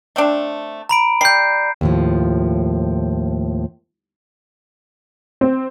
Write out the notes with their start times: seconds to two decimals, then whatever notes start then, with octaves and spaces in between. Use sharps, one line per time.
0.16 A3 C4 D4
0.89 A#5 B5 D7
1.21 G3 G6 C7
1.81 D#2 A2 F3
5.41 C4